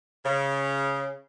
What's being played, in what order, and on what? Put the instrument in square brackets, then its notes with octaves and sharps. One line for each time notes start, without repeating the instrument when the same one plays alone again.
[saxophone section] C#3